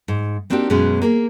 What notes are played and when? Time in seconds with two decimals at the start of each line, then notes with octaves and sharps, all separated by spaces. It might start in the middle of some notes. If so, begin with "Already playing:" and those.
0.08 G#2
0.50 A#3 C4 D4 D#4 F#4 G4
0.70 F#2 B2 G#3 B3 C#4 G#4
1.02 A#3 G#4 A#4